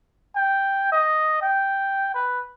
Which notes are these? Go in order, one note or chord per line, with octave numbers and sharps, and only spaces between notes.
G5
D#5
G5
B4